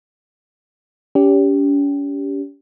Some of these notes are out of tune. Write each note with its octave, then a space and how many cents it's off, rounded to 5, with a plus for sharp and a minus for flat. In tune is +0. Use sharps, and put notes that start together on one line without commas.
C#4 +40 G4 +0